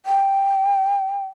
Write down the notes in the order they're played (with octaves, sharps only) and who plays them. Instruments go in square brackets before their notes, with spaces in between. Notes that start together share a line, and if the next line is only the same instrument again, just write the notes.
[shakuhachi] G5